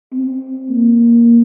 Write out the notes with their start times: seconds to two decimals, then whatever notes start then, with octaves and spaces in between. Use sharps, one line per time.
0.13 C4
0.70 A#3